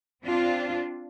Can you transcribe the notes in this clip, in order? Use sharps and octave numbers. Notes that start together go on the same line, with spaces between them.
C4 D4 F4